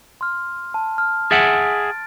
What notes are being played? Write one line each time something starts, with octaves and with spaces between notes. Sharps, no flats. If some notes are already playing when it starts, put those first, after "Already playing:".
C6 F6
A5
F6
G#4 E5 F#5 A6 D7